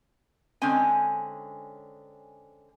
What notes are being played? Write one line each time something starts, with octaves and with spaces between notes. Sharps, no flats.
D3 G#3 C4 C#4 G#5